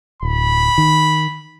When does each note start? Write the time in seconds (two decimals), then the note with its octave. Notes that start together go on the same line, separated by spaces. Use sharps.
0.23 D1 B5
0.78 D#3